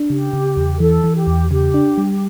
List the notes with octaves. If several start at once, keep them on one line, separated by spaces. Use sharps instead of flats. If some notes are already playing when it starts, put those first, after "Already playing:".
Already playing: D4
C#3 G4
C#3
E2
E3 A4
E3
G4
E2
C#3 G4
D4
G3